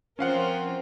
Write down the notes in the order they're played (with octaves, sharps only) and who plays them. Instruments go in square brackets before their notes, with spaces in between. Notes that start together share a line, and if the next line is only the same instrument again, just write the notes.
[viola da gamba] F3 C4 A#4 [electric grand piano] C#4 F5 F#5